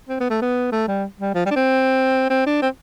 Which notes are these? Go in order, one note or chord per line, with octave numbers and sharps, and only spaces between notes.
C4
B3
A3
B3
A3
G3
G3
F3
G3
D4
C4
C4
D4
C4